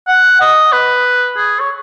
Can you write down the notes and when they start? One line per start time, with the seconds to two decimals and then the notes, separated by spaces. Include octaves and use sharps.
0.08 F#5
0.41 D#5
0.73 B4
1.37 G#4
1.60 C#5